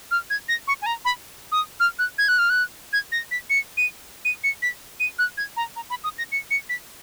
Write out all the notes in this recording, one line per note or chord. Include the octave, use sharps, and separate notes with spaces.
F6
G#6
A#6
C#6
G#5
A#5
B5
D#6
F6
F#6
G#6
F#6
F6
F#6
G#6
A#6
B6
C#7
D#7
D#7
C#7
B6
D#7
F#6
G#6
A#5
A#5
B5
D#6
A#6
C#7
C#7
B6